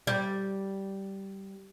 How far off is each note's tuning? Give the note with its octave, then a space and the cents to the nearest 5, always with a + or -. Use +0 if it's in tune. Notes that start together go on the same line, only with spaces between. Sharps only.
G3 -10